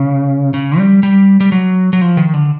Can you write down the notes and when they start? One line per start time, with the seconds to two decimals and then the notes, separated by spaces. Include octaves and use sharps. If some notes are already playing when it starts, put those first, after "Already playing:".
Already playing: C#3
0.54 C#3
0.78 G3
1.03 G3
1.40 G3
1.52 F#3
1.93 F#3
2.01 F3
2.17 D#3
2.34 D3